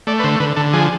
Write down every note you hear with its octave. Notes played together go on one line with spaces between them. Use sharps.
A3 D5
B4
D3 C5
D3 B4
D3 A4
F3 G#4